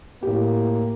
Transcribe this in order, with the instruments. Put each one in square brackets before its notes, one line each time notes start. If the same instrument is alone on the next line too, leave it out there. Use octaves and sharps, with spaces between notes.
[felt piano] A2 G4 [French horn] A#3